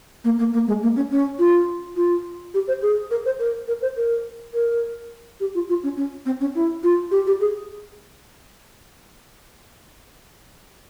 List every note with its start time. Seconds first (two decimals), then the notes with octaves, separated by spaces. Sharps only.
0.24 A#3
0.38 A#3
0.53 A#3
0.67 G#3
0.82 A#3
0.95 C#4
1.11 C#4
1.38 F4
1.96 F4
2.54 G4
2.67 C5
2.82 G#4
3.10 A#4
3.25 C5
3.39 A#4
3.67 A#4
3.82 C5
3.96 A#4
4.53 A#4
5.40 G4
5.54 F4
5.69 F4
5.83 C#4
5.96 C#4
6.25 C4
6.40 C#4
6.55 E4
6.83 F4
7.11 G4
7.26 G4
7.40 G#4